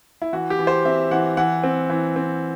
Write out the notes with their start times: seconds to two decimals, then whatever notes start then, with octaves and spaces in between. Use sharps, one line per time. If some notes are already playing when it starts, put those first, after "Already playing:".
0.22 E4
0.33 E3 F#4
0.50 G4
0.59 E3
0.67 C5
0.85 C4 E5
1.11 E3 F#5
1.37 E3 F#5
1.63 C4
1.90 E3
2.16 C4